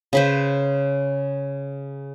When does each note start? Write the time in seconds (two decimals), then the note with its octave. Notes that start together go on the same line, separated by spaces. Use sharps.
0.13 C#3 B4 C5